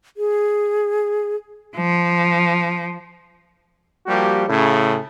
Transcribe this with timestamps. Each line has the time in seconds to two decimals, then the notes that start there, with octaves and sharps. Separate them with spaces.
0.17 G#4
1.76 F3
4.07 F3 G3 A#3 F#4 G4
4.48 A2 C#3